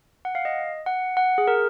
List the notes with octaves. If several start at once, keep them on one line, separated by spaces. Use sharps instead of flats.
F#5
F5
D#5
F#5
F#5
G#4
A#4